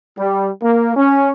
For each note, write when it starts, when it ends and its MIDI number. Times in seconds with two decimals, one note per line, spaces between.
0.18 0.49 55
0.63 0.96 58
0.97 1.32 61